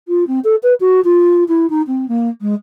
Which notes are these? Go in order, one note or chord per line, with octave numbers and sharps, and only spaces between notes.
F4
C4
A4
B4
F#4
F4
E4
D#4
C4
A#3
G#3